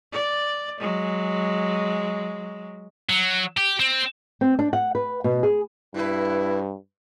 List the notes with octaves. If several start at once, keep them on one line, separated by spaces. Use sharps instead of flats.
D5
F#3 G#3
F#3
G4
C4
C4
D4
F#5
B4
B2
G#4
G2 B2 E4 B4